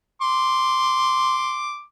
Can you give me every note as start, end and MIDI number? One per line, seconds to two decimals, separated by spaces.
0.21 1.82 84
0.21 1.82 86